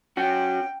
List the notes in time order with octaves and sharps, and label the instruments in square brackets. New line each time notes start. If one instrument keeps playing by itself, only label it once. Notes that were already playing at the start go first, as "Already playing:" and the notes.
[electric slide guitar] C#4 F#4 [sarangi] G5